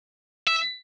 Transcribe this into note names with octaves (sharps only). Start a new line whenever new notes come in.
E5